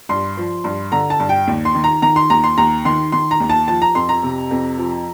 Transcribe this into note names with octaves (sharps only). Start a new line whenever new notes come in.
G2 C6
F3
G2
D3 A#5
A5
G2
G5
D#2
C6
D#3
A#5
D#3 A#5
C6
D#2 A#5
C6
D#2 A#5
D#3 C6
D#3 C6
A#5
D#2
A5
F3 A5
A#5
F2 C6
A#5
C3
F2
F3